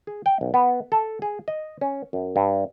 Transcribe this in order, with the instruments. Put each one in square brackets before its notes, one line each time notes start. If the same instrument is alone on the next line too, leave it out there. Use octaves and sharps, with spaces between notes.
[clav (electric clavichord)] G#4
G5
B1
B3
A4
G#4
D#5
C#4
F#2
G2